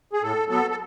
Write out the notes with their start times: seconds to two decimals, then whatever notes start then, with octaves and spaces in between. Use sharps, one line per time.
0.13 G#4
0.22 A2 A4
0.49 F#3 B3 A4
0.70 A4